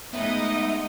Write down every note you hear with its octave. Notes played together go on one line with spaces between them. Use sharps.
G#3 A3 B3 D#4 D#5 E5 D#6